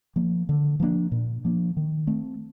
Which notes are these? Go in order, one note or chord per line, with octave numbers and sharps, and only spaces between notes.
F3 A#3
D3
F3 A#3 D4
A#2
F3 A#3 D4
D#3
A3 C4